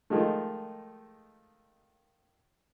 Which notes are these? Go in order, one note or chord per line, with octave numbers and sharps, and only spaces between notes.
D#3 F3 G#3 A3